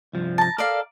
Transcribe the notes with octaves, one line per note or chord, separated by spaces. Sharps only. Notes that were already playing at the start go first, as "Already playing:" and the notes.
C2 G2 F3
A5 A#5
A4 A#4 D5 F5